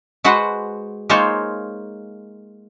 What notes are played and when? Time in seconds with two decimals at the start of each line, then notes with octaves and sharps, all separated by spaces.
0.24 G#3 F#4 B4 C5 F#5
1.10 G#3 A#3 D#4 F4 C5 C#5